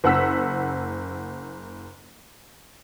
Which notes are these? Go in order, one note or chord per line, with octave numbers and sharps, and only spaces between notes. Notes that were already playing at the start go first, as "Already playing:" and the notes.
F#1 F#5 E6 B6